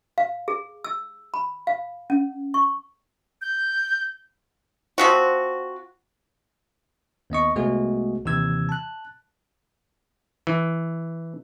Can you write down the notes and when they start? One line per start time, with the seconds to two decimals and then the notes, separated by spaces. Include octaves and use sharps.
0.18 F5
0.48 G#4
0.84 E6
1.34 B5
1.67 F5
2.10 C#4
2.54 C#6
3.42 G6
4.98 F3 C4 F#4
7.30 D#2 B3 D#5 C#6
7.56 C2 G#3 A3 B3 F#4 G#4
8.25 D#2 C3 E3 E6 G#6
8.69 A5 F#6
10.47 E3